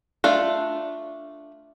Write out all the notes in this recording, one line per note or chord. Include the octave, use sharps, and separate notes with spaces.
A3 D4 F4